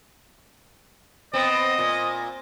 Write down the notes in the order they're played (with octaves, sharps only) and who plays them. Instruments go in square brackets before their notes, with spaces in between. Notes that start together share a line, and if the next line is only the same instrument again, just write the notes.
[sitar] B3 C4 [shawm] D#5
[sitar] A#2